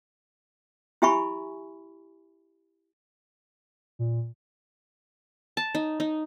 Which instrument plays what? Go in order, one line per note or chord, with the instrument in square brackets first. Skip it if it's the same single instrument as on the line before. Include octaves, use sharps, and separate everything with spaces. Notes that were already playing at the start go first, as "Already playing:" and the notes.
[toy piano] E4 G4 E5 G#5 B5 C#6
[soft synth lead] A#2
[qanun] A5
D#4
D#4